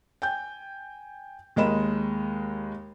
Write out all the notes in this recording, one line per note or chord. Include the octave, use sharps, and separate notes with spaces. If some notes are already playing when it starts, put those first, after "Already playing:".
G5 G#5 G6
D#2 G#3 A#4 D#5 B5 E7